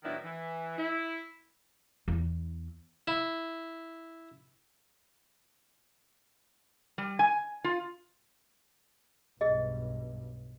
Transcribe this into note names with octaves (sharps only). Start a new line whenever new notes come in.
A2 D#3 F#3 B3 D4 E4
E3
E4
E2 E4
E4
G3
G#5
F4
B1 G2 G#4 D#5